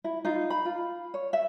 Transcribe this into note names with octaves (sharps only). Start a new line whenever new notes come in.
E4
D#4 F4
B5
F4
C#5
E5